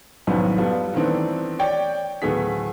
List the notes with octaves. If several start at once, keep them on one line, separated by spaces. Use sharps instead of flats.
C2 F#2 A2 D#3 F3 B3
G3 B3 F4 A4
D#3 E3 A3 B3 C4 D4
C#5 D5 G5
D1 A3 B3 G#4 B6